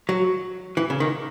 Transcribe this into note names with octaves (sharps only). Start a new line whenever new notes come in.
F#3
E3
C#3
D#3